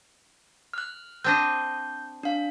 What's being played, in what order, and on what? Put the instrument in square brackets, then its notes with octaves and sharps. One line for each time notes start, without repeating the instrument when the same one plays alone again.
[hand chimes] F6 F#6
[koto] C4 D4 D#5 [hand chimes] G6
[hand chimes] D4 F5